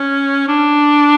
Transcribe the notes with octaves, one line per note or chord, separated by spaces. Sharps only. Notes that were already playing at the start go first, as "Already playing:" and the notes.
Already playing: C#4
D4